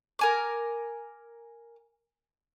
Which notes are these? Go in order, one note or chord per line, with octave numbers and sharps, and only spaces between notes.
A#4 G#5 D6